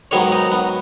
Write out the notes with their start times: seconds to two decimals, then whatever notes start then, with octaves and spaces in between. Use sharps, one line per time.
0.11 G#2 D#3 F#3 B3 C#5
0.32 D#4
0.52 B3